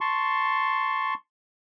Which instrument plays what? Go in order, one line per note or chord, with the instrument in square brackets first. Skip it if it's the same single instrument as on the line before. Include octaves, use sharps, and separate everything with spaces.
[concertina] A5 C6 C#6